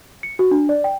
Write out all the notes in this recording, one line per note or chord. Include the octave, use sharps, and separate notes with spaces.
C#7
F#4
D4
D5
G5